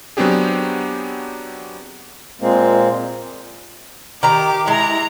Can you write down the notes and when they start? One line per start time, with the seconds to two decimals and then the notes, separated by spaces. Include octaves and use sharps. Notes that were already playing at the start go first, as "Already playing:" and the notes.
0.17 F#3 B3 C4 D4 G4 G#4
2.41 A#2 G#3 A#3 C4
4.23 D#3 G4 A#5 D6
4.67 G#3 E4 A#5